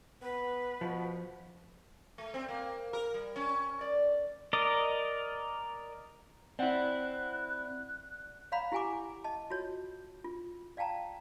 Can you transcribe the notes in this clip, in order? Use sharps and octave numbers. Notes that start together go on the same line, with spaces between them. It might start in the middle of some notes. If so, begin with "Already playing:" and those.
B3 B4
B2 F3
A3
C4
A#3
A#4
G3
C#4
D5
A#4 D5 D#5
C4 E4 D5 F#5 F#6
C#5 D5 F5 F#5 A#5 B5
E4 G4 F#5 G#5 A#5 D6
D#5 A5
F4 F#4 C#5 D#5
F4
D5 F5 G5 A5 A#5